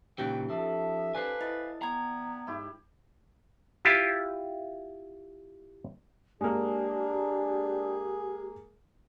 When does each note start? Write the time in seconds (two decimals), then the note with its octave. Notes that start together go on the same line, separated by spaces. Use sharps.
0.18 C#2 A#2 E3 C#4 D#4 G4 G5
0.49 F3 A4 E5
1.15 B4 C5 D5 F5 G#5
1.41 E4 D#5 A6
1.82 B3 G5 A#5 G#6
2.47 G#2 E4 G4
3.85 E4 F4 G4
6.41 G#3 A#3 D4 G4 G#4